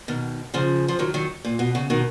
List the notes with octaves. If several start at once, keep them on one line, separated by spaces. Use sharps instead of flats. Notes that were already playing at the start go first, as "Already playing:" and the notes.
B2 D#3
C#3 F3
F3
D#3 F#3
D#3 F#3
A#2
B2
C#3
B2 D#3